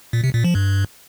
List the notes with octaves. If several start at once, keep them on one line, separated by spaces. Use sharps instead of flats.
A#2
C3
A#2
F3
G2